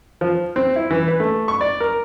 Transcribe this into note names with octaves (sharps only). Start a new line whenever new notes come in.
F3
C4
E4
E3
B4
A3
C#6
D5
A#4